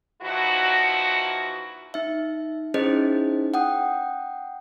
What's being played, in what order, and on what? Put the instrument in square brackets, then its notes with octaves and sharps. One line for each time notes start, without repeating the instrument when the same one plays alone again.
[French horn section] E2 F3 D#4 E4 F#4
[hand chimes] D#4 E5
C#4 D#4 E4 G#4 C5 D#5
F#5 G5 D#6